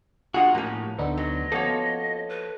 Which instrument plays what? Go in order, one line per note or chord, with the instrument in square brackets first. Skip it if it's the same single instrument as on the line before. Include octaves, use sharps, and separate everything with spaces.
[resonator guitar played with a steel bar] A#3 F4 F#5 [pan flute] D4 [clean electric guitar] F#4 [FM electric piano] G#4 D#5
[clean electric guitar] A2 [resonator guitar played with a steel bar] F3 C#4 [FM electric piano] A#3 F#5 A#5 [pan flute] G4
[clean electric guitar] D2 [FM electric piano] B3 D4 D#4 [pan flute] A4
[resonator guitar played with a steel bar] F#3 [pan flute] D#5
[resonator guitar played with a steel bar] F3 A#3 C#5 [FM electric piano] B3 C#4 F#4 [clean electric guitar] A4
[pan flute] B4